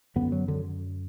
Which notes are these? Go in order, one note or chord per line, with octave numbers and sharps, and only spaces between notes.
F#2 D3 B3
F#3
D3